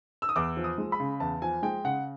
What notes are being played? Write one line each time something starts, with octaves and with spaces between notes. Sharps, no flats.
E6
D#6
E2 D6
F3
D#6
G#3
B5
C#3
E2 A5
F3 G#5
G#3 G5
C#3 F#5